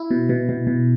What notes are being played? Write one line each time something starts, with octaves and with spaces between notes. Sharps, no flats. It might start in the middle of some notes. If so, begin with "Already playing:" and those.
Already playing: E4
B2
B2
B2
B2